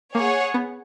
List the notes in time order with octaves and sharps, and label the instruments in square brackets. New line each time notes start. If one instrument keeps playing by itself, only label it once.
[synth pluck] A#3 [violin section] G#4 C#5 F#5
[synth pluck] B3